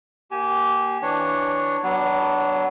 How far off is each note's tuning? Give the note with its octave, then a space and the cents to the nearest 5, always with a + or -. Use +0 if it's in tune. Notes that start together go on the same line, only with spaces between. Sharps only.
A#3 +0 G4 -20 G#5 +10
E3 +0 D4 +5 C#5 -5
F#3 +20 B3 -10 D4 +0